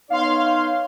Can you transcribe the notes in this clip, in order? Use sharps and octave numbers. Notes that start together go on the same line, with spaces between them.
B3 D#4 C#5 F5 C6